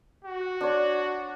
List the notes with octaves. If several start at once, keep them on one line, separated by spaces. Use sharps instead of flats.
F#4
D4 C#5